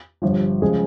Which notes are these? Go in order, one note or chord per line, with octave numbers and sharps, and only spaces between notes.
G1 G2 F3
C#3 F3 G#3 G#4